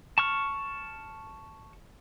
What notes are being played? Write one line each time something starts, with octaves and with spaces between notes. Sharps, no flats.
A5 C#6 F6